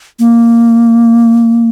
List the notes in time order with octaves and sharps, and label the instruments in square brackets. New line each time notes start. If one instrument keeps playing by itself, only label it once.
[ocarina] A#3